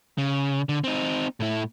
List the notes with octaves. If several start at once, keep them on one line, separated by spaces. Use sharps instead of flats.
C#3
D3
C4 D#4
A2 E4